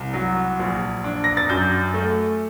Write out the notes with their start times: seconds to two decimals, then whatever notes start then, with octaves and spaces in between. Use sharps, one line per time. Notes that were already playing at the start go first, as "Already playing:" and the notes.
Already playing: C2
0.14 F#3
0.59 A#1
1.04 D4
1.24 A#6
1.37 A6
1.49 F#2 G6
1.94 A3